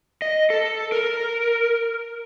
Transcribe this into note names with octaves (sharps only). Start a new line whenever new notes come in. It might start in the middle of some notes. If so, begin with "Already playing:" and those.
D#5
A4
A#4